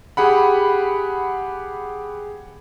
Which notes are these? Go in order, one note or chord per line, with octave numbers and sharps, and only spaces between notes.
G4 G#4 F#5 B5